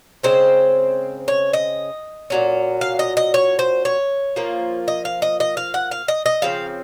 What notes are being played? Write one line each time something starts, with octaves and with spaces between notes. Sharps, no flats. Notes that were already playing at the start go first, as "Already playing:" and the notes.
C#3 G#3 C4 C5
C#5
D#5
A#2 F#3 C#4
F5
D#5
D#5
C#5
C5
C#5
F3 A#3 F4
D#5
F5
D#5
D#5
F5
F#5
F5
D#5
D#5
C#3 F3 C4 F5